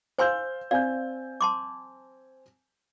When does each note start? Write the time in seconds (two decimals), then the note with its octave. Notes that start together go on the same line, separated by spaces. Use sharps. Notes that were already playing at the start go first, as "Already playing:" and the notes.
0.18 C5 F5 G#5 C6 E6 G6
0.71 C4 D5 F5 G#5 G6
1.41 A5 C6 D6